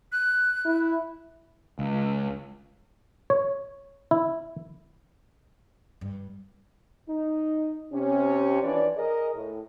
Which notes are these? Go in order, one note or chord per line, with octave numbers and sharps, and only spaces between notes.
F#6
E4
C#2
C#5
E4
G2
D#4
C3 C#4
E3 F3 D4 B4 C#5 D5
G#4 A#4 D#5
A2